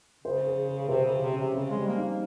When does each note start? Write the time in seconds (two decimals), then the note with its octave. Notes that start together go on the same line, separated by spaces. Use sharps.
0.24 C#3 C5
0.46 G#4
0.68 G#4
0.89 C3 C5
1.05 C#3
1.11 G#4
1.21 C3
1.32 C#4
1.38 C3
1.53 C#3 C4
1.70 G#3
1.76 G3
1.87 A#3
1.97 D#4
2.02 A#3